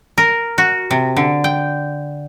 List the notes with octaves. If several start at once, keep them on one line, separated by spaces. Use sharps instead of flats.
A#4
F#4
C3
D3
G5